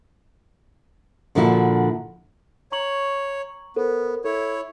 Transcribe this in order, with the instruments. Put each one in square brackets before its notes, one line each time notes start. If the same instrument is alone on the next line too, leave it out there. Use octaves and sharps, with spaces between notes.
[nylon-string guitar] A#2 D3 F3 E4 F#4
[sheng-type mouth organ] C#5 [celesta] A#5 C#6 F#7
[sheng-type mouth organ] B3 [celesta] A4 A#4 C5
[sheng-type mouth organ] E4 C#5 [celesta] A4